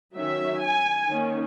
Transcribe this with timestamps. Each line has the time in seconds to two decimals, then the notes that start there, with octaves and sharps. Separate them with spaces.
0.16 D#3 F#3 C#4 E5
0.62 G#5
1.09 D#3 A#3 C#4